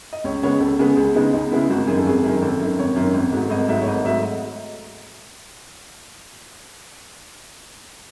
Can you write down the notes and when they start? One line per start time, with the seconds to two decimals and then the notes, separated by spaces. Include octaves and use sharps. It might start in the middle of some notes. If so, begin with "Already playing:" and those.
0.13 D#5
0.24 C#2 C#5
0.43 C#3 G#3 B3 C#5
0.60 C#2 A4
0.79 C#3 G#3 B3 G#4
0.97 C#2 G#4
1.15 C#3 G#3 B3 D#4
1.33 C#2 D#4
1.52 C#3 G#3 B3 E4
1.70 G#1 F#4
1.87 F#2 D#3 G#4
1.98 A4
2.06 G#1 G#4
2.24 F#2 D#3
2.42 G#1 A4
2.60 F#2 D#3
2.79 G#1 C#5
2.96 F#2 D#3
3.14 G#1
3.32 G#2 F#3 A3
3.50 G#1 D#5
3.69 G#2 F#3 A3 E5
3.82 C#5
3.87 G#1 D#5
4.05 G#2 F#3 A3 E5
4.23 D#5